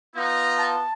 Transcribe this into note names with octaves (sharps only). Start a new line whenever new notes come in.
B3 D#4 F4 A#5
A5